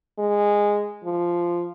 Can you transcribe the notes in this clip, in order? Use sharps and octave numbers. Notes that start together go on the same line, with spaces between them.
G#3
F3